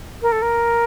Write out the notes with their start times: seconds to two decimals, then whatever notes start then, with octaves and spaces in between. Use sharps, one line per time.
0.22 A#4
0.32 A4
0.42 A#4